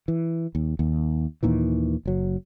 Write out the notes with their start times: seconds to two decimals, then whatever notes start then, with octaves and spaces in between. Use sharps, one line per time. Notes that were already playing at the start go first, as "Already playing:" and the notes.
0.08 E3
0.55 D#2
0.79 D#2
1.43 D#2 A#2 D#3 E3
2.06 F#1 F#3